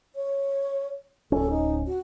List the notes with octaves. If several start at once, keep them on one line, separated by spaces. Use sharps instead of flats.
C#5
D1 C#4 A4
D#4
F#4